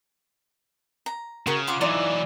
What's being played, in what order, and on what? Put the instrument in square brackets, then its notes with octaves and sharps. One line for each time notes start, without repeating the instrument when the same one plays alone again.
[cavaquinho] A#5
[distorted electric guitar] C#3 [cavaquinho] F#4 A#4 C#6
[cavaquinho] F4 F#5 D6
[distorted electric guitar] E3 F#3 [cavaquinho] D#4 F4 [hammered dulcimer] D5 E5